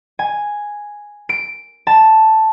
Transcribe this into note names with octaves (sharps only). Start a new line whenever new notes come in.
G#5
D7
A5